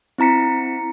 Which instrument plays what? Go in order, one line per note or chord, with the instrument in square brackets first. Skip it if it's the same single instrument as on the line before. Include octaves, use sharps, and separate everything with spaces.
[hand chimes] C4 E4 A#5 B6 C#7